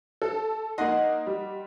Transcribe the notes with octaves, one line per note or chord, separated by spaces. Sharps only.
A4
A#3 D#4 D#5 F#5 C6
G3